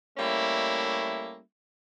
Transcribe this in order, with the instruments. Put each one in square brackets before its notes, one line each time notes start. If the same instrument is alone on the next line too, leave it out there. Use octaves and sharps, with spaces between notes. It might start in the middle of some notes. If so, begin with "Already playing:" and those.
[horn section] G3 A3 A#3 C#4 E4